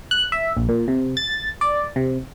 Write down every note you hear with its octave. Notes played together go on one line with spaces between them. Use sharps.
F#6
E5
A#1
A#2
C3
A6
D5
C3